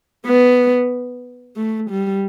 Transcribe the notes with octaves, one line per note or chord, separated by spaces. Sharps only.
B3
A3
G3